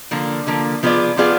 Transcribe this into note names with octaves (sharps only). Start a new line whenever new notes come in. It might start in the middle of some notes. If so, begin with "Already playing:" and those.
D3 F3 A#3
D3 F3 A#3
F3 B3 F4 G#4 D5
F3 B3 F4 G#4 D5